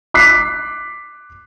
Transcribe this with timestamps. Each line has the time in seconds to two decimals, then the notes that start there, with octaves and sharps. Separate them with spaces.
0.14 D6 F#6 B6 C7